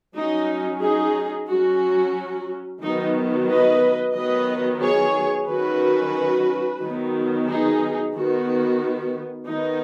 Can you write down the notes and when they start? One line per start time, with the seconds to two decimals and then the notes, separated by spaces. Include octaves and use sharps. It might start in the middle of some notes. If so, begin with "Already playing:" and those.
0.15 F#3 C#4 D#4
0.82 D#4 G#4
1.49 F#3 C#4 F#4
2.81 D#3 F#3 B3 D#4
3.48 B4 D#5
4.15 D#3 F#3 B3 B4 D#5
4.81 G#4 C#5
5.48 D#3 F#3 C#4 F#4 B4
6.82 D#3 F#3 B3
7.48 D#4 G#4
8.15 D#3 B3 F#4
9.47 D#3 B3 D#4